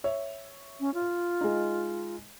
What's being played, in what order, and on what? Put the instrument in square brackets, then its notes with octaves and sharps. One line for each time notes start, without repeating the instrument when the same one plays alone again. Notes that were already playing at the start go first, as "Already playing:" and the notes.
[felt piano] C#5 E5
[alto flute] C#4
F4
[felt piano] G#3 D#4